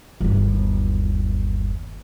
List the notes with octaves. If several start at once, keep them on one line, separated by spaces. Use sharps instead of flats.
G1 D#2